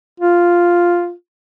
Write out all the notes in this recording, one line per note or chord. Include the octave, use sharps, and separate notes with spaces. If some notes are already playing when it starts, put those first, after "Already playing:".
F4